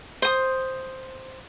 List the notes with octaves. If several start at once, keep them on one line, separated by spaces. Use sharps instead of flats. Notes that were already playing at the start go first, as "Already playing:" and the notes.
C5 D#6